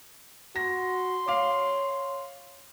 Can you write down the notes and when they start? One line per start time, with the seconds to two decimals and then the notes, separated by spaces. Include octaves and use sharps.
0.56 F#4 C6 A#6
1.28 C#5 F5 D6